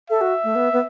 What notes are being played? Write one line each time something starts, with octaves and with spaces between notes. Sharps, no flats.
A4 E5
F#4
A3
B3
B3